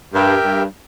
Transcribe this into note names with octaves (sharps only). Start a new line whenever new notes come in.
G2 G4 A#4 E5 G5
G2